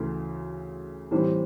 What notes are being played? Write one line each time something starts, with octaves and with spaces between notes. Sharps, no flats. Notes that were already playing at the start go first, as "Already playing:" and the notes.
Already playing: D2 C#3 E3 A3
A2 E3 G3 C4